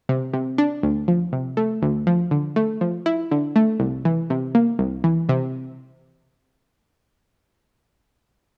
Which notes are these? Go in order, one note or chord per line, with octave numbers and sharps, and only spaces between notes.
C3
C3
D4
D2
F3
C3
A3
D2
F3
D3
A3
F3
E4
D3
A3
C2
E3
C3
A#3
C2
E3
C3